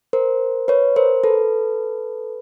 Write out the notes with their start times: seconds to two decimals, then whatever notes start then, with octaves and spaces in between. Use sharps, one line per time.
0.13 A#4 C5
0.68 B4 C#5
0.96 A#4 C5
1.24 A4 B4